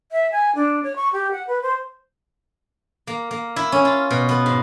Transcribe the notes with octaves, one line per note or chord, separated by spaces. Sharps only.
E5
G#5
D4
C#5
C#6
G4
F#5
B4
C5
A#3
A#3
E4
C#4
F4
B2
B3
G#2